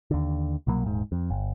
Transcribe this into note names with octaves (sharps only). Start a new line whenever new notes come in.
D#2 D3
C2 B2 F#3 A#3
D#1 G#2
F2
G1